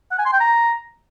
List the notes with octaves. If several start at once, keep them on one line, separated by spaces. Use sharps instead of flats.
F#5
G#5
C6
G5
A#5